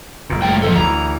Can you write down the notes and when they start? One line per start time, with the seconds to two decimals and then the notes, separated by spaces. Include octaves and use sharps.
0.30 F#1 A#2
0.42 A2 G#3 G5
0.62 F3 G3 A4
0.76 D2 D#3 E3 A#5